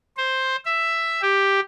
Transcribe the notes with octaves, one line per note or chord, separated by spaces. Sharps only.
C5
E5
G4